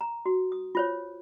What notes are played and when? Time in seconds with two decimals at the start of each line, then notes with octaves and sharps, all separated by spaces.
0.01 A#5
0.26 F#4
0.52 D#6
0.75 F4 C5 C#5